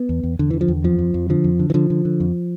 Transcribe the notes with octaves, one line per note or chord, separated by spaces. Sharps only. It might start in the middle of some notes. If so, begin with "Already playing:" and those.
Already playing: B3
E2
E2
E2 D3
D3 E3
F3
E2
F2 F3
F2
F2
D3 F3
F2
D3
E3
D3 F3
D3
D3
F2